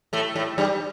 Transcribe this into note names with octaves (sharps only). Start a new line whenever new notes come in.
A2 A3
A2 A3
G2 G3